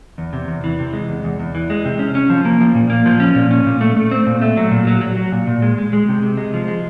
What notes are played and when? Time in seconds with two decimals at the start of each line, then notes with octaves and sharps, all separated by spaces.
0.18 E2
0.33 C3
0.48 E2
0.64 E3
0.79 C3
0.93 G#3
1.09 E2
1.24 E2
1.39 E2
1.55 E3
1.70 G#3
1.85 C3
1.99 C#4
2.15 C#4
2.30 F3
2.45 A#3
2.61 F3
2.75 A#2
2.90 A#3
3.06 F3
3.20 C#4
3.35 A#2
3.51 C#4
3.67 A#2
3.81 A3
3.97 A3
4.11 C4
4.26 A#2
4.41 A3
4.57 F#3
4.71 A#2
4.87 F#3
5.01 F#3
5.17 F#3
5.32 A#2
5.47 A#2
5.62 G#3
5.78 G#3
5.93 G#3
6.08 C3
6.23 C3
6.37 G#3
6.54 F3
6.68 G#3